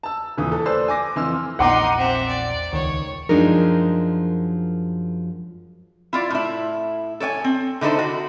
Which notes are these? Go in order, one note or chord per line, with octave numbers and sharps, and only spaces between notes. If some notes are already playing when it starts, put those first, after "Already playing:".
A5 E6
D#1 E3 D#6
A4
A3 B4 C5 D5 E6 C7
G#5 D6 A#6
F2 E3 C6 E6 F6
A#1 E2 A#2 D#4 F#5 C6 D6
C4 E5
D5
D#1 C#2 D#3 C#5
F#2 F3 G#3 D4 D#4 A#4
E4 F4 D5
A2 E4
A4 C#5 D5 G#5
C4
D3 D#4 E4 A4 C5
F#4